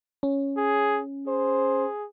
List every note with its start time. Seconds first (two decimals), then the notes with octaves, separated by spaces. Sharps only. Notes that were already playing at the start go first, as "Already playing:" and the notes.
0.23 C#4
0.58 G#4
1.28 G#4 C5